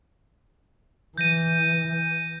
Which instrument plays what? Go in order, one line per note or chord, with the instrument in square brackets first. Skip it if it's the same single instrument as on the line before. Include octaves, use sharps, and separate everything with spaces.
[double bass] E3 [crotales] G6 A#6 D#7